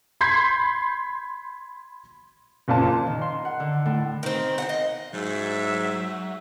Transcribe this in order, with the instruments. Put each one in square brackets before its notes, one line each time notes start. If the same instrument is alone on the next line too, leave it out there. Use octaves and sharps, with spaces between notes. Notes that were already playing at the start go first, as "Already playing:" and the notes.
[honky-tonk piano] B5 C6 G6 G#6 B6 C7
F#1 A#2 A5
[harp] D#3
C6
F#5
D3
A2
[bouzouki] D#3 C4
C5 D#5 F#5
D#5
[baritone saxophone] G#2 [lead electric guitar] F#3 [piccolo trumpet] E5